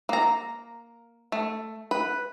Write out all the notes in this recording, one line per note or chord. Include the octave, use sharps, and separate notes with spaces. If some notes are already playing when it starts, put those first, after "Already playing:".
A#3 A#5
A3
B4